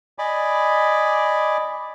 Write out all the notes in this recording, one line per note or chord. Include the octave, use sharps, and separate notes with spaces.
D5 D#5 G#5 B5 D6